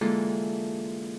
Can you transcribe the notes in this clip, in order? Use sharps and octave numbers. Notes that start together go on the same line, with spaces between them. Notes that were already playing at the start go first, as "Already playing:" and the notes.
D3 E3 G#3 A#3 F4 A4